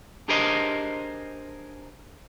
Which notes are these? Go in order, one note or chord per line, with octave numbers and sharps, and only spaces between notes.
D4 G4 G#4 A#4 C5 D#5